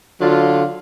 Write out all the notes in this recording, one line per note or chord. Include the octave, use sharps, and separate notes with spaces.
D3 F#3 F4